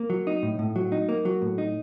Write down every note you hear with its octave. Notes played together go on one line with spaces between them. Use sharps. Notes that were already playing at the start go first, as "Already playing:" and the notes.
Already playing: A#3
F#3
D#4
A2
A2
F#3
D#4
A#3
F#3
A2
D#4